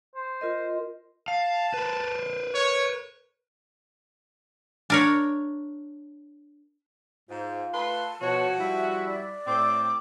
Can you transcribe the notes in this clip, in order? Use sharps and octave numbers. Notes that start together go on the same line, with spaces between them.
C5
F4 A#4 D#5
F5 A5
A#4 B4
C#5
D4 A#4 C#5
G#2 F4 C5
A3 B4 A5 C6
B2 F3 F#4 C#5
G3 E4 E5
D5
A2 C4 D6